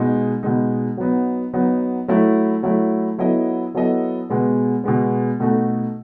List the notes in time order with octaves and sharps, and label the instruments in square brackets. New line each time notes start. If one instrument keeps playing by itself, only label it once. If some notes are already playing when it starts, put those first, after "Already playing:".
Already playing: [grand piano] B2 G#3 D#4
B2 G#3 D#4
F#3 B3 D#4
F#3 B3 D#4
F#3 A3 E4
F#3 A3 E4
F#3 B3 E4 A4 D#5
F#3 B3 E4 A4 D#5
B2 G#3 B3
B2 G#3 B3
B2 A3 D#4 F#4 A4